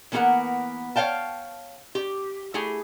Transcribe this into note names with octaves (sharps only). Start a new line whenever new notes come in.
E3 A#3 B3 F4 A#4 F#5
C#5 D5 F5 G5 A5
G4
A3 E4 G4 G#4 G#5